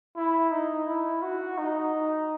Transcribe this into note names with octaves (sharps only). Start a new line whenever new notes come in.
E4
D#4
E4
F#4
D#4